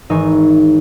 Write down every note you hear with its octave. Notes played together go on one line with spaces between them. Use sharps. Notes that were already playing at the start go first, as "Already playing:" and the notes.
G#1 E3 D#4 G#5 C6 C#6